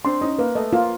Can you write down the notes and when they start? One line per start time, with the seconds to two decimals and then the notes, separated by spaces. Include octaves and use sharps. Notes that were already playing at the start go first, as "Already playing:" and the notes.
0.04 C4 D4 C6
0.21 C#4 D#4 D#5
0.39 A#3 B4
0.55 A3 D#5
0.72 A#3 F4